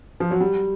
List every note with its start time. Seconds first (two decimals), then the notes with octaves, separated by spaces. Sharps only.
0.20 F3
0.31 F#3
0.41 G3